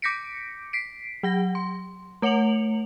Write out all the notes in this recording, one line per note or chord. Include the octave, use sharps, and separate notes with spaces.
D6 G6 A#6 B6 C#7 D7
B6 C7 D7
F#3 F#5 A#6
C6
A3 C#5 F#5 C#7 F7 F#7